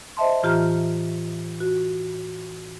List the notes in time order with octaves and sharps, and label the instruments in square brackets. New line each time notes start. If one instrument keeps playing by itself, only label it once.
[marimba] C5 D#5 E5 A5 C6
A2 E3 F4 G4 A#5 F6
F#4